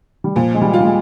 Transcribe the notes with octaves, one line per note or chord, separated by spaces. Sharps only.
G3
A#2 F3
G#3
G3
F4
G3
G#3